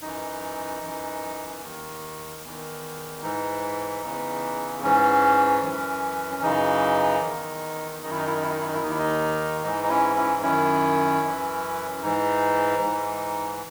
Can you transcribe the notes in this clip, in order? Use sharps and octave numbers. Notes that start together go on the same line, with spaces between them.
F#2 E3 D#4
F#2 E3
D#2 D#3
E2 D#3
G#2 E3 D#4
E2 C#3 E3
G#2 E3 C#4
F#2 E3
C#4
F#2 C#3 E3 D#4
E2 D#3
F#2 D#3 D#4
E4
D#4
E4
D#4
E4
D#4
E4
D#4
E4
D#2 D#3 D#4
E4
D#4
G#2 E3 D#4
D#4
C#4 E4
C#4 E4
F#2 D#3 C#4 E4
F#2 E3
G#2 E3 D#4
G#2 E3